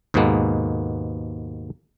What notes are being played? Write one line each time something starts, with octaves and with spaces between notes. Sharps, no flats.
D#2 G#2 B2 G#3 A#3 B3